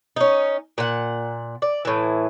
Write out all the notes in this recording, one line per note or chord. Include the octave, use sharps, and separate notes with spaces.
C#4 D#4
A#2 F#5
D5
A2 E3